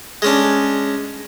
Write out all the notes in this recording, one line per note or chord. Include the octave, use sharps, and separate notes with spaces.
G#3 C#4 D4